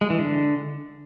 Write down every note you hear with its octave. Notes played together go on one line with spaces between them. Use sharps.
G#3
E3
D3